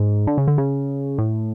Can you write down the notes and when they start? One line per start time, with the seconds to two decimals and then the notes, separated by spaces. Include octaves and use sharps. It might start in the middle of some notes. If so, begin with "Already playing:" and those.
Already playing: G#2
0.27 D3
0.38 C#3
0.48 D3
0.58 C#3
1.18 A2